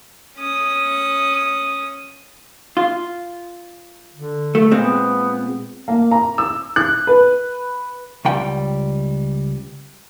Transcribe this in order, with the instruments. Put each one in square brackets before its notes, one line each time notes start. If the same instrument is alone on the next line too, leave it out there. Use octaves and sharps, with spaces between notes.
[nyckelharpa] C#4 D#6
[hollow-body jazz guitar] F4
[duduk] D3
[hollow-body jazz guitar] A3
[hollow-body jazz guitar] A#2 G#3 C4 [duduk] B3
[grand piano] A#3
A#5
E6
F#6
B4
[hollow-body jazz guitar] C#2 G3 G5